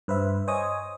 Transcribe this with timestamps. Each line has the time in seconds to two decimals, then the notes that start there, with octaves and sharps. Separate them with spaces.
0.08 G2 B4 C5 E5
0.48 C5 C#5 D#5 G#5 D#6